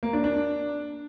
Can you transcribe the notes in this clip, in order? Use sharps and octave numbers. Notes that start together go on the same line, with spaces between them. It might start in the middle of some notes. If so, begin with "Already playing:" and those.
A#3
D4
D4